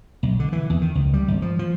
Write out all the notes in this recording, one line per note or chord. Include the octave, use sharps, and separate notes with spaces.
B1
D3
E3
E2
D#3
C#2
G3
G#1
F3
F3